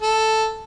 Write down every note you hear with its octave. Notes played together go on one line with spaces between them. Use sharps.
A4